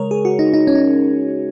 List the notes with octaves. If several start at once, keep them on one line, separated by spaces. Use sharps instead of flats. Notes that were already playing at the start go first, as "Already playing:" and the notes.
Already playing: C#3 G#3 A#4 C#5
G#4
F#4
D#4
D#4
C#4
D#4